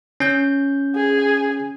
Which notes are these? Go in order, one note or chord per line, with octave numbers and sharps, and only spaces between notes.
C#4 G6
G#4